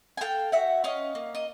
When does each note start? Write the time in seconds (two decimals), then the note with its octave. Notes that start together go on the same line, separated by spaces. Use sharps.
0.17 G#5
0.21 A4 F5 G5
0.52 F#4 E5 F#5
0.84 C#4 D#5 F5
1.15 A#3
1.35 D#5